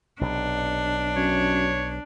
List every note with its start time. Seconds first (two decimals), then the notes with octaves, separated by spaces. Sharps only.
0.21 B1 C3 D4
1.16 F#2 C#5